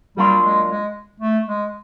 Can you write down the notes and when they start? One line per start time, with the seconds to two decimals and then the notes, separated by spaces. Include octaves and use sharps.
0.17 F#3 G3 A#3 D4 F4
0.43 G#3
0.69 G#3
1.20 A3
1.47 G#3